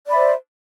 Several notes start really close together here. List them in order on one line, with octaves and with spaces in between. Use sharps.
D5 B5 E5 C5